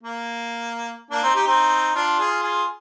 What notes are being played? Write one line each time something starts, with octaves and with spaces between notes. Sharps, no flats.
A#3
A#3 D4
C4 D#4
D#4 G4
C4 D#4
D4 F4
F4 G#4
F4 G#4